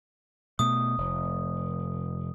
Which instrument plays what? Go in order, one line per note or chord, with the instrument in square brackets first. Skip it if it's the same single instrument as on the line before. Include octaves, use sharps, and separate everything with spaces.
[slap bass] B2 A3 [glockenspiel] D#6
[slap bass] F1